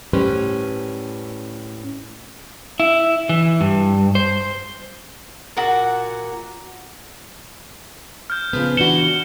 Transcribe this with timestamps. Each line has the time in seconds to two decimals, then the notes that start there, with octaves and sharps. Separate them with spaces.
0.13 A2 G3 C#4 B4 C5
2.80 E4
3.29 E3
3.61 G2
4.15 C5
5.57 A#2 F#4 F#5
8.30 F6 G6
8.53 C#3 F3 B3
8.77 E3 D4 F#4 C#7 E7 G7
9.04 G7